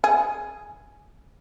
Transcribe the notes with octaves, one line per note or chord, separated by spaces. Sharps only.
G#4